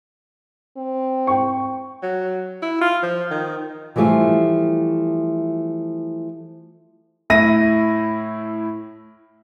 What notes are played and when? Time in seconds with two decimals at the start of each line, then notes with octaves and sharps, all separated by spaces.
0.77 C4
1.27 G5 C#6
2.03 F#3
2.62 E4
2.81 F4
3.03 F3
3.31 D#3
3.96 E3 F3 G3 A3 F4
7.30 A2 E4 A#6 D#7